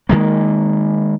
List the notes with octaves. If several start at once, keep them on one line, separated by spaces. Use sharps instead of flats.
D#3 F3 G#3 A#3